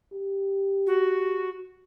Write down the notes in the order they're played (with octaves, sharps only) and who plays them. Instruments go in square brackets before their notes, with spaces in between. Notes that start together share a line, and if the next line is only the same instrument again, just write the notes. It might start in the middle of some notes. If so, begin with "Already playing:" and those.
[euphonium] G4
[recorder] F#4